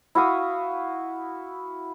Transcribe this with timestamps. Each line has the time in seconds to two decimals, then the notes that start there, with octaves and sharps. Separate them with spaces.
0.15 E4 F#4 F5 D#6